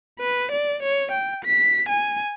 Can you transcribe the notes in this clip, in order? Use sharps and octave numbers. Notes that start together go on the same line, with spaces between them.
B4
D5
C#5
G5
B6
G#5